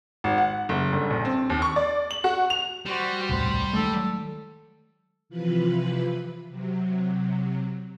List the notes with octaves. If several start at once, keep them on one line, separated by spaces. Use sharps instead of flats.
G#1
F#5
F#1
G1
A#1
C4
D#2
C#6
D5
F#7
F#4
F7
G3 F#4 C5
D#1 C2 A2 C5
D#3 G#3 A3 A4
C3 E3 F3 F4 B4 B5
C3 F#3